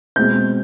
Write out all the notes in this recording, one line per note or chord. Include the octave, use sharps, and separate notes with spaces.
B2 G#3 C4 G6